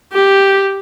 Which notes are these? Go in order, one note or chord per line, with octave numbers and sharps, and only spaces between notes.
G4